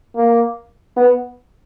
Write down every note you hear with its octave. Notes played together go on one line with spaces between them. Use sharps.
A#3
B3